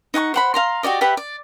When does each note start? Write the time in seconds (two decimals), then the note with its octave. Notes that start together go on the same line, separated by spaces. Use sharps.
0.14 D#4 F#5 G#5 C#6
0.34 C5 F#5 B5
0.54 F5 A#5 C6
0.83 F#4 G4 D5 D#5
1.01 G4 B4 E5 F#5
1.17 D5